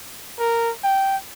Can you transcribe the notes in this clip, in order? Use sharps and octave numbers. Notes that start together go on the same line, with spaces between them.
A#4
G5